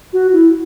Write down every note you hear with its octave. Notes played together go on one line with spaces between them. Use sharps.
F#4
E4